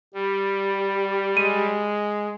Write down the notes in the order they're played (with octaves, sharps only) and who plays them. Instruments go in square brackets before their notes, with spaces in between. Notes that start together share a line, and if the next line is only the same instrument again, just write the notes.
[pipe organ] G3 [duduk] G4
[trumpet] G#3 [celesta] D#7